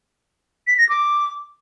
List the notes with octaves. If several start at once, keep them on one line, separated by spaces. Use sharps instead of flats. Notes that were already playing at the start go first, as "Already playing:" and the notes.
B6
A#6
D6